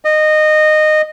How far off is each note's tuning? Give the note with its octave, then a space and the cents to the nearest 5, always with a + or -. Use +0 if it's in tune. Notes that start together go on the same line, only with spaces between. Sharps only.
D#5 -20